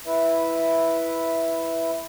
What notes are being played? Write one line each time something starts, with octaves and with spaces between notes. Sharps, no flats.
E4 B4 E5